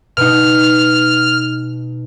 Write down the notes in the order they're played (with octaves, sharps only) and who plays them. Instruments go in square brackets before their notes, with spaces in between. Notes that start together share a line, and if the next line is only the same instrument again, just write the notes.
[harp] B2 D#4 [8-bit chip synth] F6